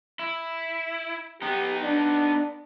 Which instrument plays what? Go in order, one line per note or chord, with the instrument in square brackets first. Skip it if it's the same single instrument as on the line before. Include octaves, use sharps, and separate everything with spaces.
[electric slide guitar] E4
[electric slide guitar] B3 D#4 [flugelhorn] G4
[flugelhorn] D4